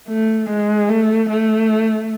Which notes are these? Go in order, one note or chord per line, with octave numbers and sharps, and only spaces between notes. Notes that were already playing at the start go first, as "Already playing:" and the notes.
A3
G#3
A3
A3